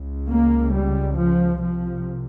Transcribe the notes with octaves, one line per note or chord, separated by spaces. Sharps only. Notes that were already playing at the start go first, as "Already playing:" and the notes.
Already playing: C#2 C#3
A#3
G3
F3
C2 C3 F3